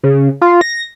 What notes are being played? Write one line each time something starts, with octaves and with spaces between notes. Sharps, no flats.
C#3
F4
A#6